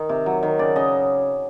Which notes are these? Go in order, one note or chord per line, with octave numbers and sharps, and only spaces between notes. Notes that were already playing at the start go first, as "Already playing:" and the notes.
Already playing: D#3
C3
F#3
D#3
C#3 D5
C#3 D#5